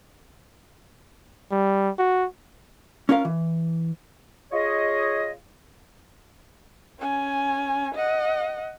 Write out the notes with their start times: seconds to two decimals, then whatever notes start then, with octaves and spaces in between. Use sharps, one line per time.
1.51 G3
1.99 F#4
3.09 C#4 F4 A#4 F5
3.25 E3
4.52 F4 G#4 C#5 D#5
7.00 C#4 G#5
7.95 D#5 F#5